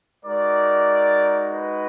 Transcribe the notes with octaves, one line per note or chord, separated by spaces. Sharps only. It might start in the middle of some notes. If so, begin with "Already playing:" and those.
G#3 D#4 F#4 A#4 D5
B4 D#5